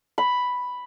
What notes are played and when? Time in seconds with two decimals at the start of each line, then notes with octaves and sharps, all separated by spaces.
0.18 B5